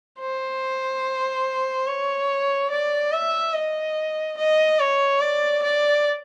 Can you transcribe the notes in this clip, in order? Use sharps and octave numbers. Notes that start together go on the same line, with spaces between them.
C5
C#5
D5
E5
D#5
D#5
C#5
D5
D5